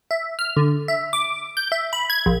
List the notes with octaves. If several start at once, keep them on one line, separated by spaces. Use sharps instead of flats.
E5
F6
D3
E5
D6
G6
E5
B5
G#6
A#1